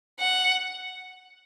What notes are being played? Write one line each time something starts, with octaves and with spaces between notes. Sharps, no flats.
F#5